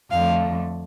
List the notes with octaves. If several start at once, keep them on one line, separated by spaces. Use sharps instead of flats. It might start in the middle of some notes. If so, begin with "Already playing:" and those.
F2 D3 A3 F5